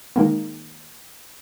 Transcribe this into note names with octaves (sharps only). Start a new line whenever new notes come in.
D#3 G#3 A#3